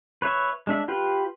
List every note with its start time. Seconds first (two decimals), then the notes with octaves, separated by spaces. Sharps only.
0.22 B4 C#5 E5
0.67 G#3 D4 E5
0.88 F4 G4 B4